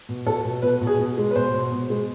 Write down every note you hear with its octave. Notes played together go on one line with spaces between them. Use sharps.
B2
B2 A4
B2
B2 B4
B2
G#4
B2
G#3
B4
B2 C5
B2
B2
G#3